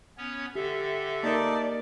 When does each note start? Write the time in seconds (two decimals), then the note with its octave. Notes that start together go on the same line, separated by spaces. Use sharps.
0.18 B3 C#4 C#5
0.55 D3 G4 A4 E5
1.23 A#3 D#4 A#4 D5 A5